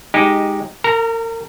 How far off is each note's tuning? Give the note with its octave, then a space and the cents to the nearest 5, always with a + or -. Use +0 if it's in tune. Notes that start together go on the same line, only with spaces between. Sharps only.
G#3 -10 D#4 +5 G4 +0
A#4 -35 A#5 +0